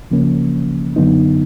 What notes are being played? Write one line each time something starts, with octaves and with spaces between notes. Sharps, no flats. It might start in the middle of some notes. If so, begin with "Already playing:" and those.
C#2 C#3 F3 A#3 C#4
F#2 D3 F#3 B3 D#4